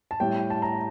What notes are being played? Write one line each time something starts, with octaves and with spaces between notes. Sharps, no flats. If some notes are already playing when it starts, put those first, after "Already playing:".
A5
A2 G3 G5
A5
A#5